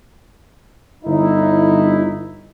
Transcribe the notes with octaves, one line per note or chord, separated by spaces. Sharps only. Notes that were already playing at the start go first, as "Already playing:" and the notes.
G1 D#4 E4